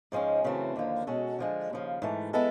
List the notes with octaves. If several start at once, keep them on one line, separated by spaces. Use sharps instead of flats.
G#2 F3 G#3 C#4
F#2 C#3 E3 A3 C4
D#2 D3 F3 A#3
B2 G#3 C#4 F#4 A4
D3 F3 G#3
D#2 C#3 F3
G#2 E3 A3
G#3 B3 E4 A4